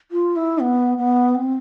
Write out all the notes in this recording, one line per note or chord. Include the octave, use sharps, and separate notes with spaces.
F4
E4
B3
B3
C4